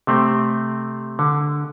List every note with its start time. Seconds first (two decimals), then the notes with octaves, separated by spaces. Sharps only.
0.07 C3 A3 C4
1.19 D3